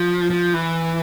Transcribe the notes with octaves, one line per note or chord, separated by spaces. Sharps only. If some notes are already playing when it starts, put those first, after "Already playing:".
Already playing: F3
F3
E3